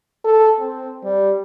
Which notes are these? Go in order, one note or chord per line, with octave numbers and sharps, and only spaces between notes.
A4
C4
G3